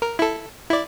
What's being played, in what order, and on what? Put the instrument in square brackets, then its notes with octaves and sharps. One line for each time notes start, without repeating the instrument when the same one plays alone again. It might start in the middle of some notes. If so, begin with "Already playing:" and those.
[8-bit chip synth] A#4
E4 A4
E4 D5